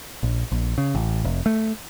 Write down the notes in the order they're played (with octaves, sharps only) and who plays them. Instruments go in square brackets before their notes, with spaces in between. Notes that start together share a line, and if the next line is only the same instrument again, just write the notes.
[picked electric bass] A#1
A#1
C#3
A1
F1
A3